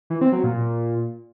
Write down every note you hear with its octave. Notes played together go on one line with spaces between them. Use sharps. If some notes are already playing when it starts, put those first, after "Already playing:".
E3
C4
F#3
A#2